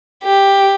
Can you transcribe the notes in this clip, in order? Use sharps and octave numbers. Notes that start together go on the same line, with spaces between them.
G4